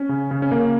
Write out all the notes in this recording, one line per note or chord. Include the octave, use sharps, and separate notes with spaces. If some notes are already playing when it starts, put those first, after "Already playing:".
Already playing: C#4
C#3
C#3
C#4
C#3 A#3